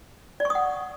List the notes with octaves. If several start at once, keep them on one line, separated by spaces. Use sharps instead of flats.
D5
C#6
D#6
F#5